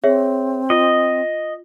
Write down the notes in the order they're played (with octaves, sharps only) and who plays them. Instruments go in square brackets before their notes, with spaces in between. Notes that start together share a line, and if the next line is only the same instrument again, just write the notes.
[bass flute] C4 [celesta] G#4 C#5 E5
[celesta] F4 [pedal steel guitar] D#5